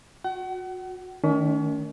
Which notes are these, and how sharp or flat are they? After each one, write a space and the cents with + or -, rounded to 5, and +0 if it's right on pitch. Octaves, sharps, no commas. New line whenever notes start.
F#4 -30 F#5 +40
D#3 +0 A3 +0 C#4 +40